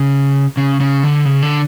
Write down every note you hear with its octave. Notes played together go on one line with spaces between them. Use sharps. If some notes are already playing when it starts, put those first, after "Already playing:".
Already playing: C#3
C#3
C#3
D3
C#3
D3